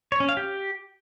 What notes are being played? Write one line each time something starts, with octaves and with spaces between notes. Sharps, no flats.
C#5
C#4
F5
G4